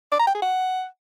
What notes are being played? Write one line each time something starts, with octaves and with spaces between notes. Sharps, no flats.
D5
A#5
G5
G#4
F#5